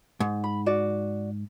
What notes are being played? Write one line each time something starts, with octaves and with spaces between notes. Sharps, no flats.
G#2
B5
F#4 D5